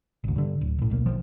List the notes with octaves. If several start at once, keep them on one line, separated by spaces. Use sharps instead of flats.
G#1 D2
G2 D3
D1
A#1 A2
D1 B1 A#3
B1 F3